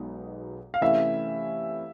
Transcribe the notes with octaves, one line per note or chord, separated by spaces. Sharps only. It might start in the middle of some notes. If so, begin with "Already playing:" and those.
Already playing: B1 B2 G#3 B3 D#4
F5
C3 E3 A3 C#4 E4 E5